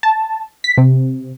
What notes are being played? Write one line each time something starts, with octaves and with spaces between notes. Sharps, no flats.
A5
B6
C3